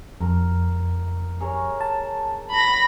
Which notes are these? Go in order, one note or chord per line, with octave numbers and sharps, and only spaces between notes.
F2 A#4
G#4 A#4 C#5
A5
B5 A#6